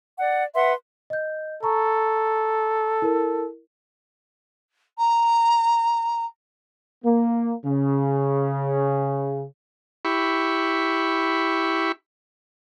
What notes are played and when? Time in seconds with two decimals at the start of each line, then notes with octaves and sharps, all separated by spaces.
0.18 D5 F#5
0.55 B4 E5 F#5 C6
1.10 D#5 G6
1.63 A4 A#5 C#6
3.02 E4 A#4
4.98 A#5
7.05 A#3
7.65 C#3
10.05 E4 G4 B5 C#6